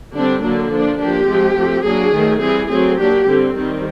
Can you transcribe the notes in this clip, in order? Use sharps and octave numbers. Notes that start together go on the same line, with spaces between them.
D3 G3 C4 D4
D3 F#3 A#3 D4
F3 A#3 D4
F3 A#3 D4 G4
F3 G#3 C4
F3 A3 C4
F#3 A#3 D4 G#4
D#3 F#3 A3
E3 G3 C4 G#4
F#3 A3 C4 G#4
F#3 A#3 D4 G4
D3 G3 C4
D#3 G3 C4